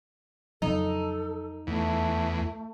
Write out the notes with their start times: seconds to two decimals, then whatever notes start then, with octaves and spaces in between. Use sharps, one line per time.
0.62 F2 C#3 F#3 D#4 A4
1.67 E2 A3